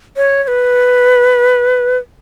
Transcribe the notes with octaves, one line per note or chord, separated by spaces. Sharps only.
C#5
C#5
B4